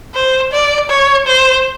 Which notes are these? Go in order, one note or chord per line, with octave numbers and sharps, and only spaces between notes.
C5
D5
C#5
C5